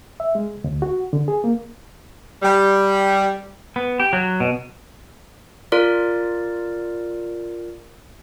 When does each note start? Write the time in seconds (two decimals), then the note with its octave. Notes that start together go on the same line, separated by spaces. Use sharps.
0.20 E5
0.35 G#3
0.64 D2
0.82 F#4
1.13 D3
1.28 G#4
1.44 A#3
2.43 G3
3.76 B3
4.00 G4
4.13 F#3
4.40 B2
5.72 F4 A#4 D5